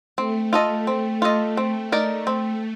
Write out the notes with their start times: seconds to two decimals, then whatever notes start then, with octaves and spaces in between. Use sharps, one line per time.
0.17 A3 C4
0.53 F4 A4 D#5
0.87 C4
1.22 F4 A4 D#5
1.57 C4
1.92 D#4 A#4 D5
2.27 C4